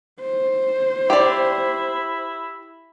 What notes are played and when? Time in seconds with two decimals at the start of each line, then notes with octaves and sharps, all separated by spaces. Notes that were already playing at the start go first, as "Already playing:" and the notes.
0.21 C5
1.10 E4 G4 D5